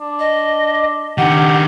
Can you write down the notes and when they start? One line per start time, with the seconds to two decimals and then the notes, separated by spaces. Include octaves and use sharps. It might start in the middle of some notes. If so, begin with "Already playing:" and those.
0.01 D4
0.19 D#5
1.18 D#3 D4 G4 F#5